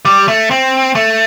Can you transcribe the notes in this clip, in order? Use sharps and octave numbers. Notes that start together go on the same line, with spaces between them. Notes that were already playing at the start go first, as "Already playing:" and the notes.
G3
A3
C4
A3